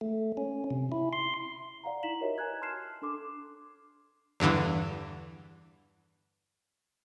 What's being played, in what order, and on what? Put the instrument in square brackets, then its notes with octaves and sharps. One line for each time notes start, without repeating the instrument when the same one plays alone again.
[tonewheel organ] A3
C#4
C3
E4
C6
[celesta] D5 F5 F#5 A#5
D#4 E4 A#5 B6 E7 F#7
F#4 G4 A#4 C#5 D#5 E5
B4 G#5 A#5 F#6 G#6
A5 C6 F6 F#6 C7 E7
D4 A4 C6 D6
[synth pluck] E2 G2 D3 E3